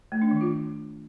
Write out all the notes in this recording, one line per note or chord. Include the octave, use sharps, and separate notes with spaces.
A3
D4
D#3
F4